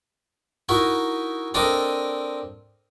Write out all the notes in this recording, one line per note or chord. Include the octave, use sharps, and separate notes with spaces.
D#4 E4 F#4 A#4
C4 D4 A4 A#4 D5 D#5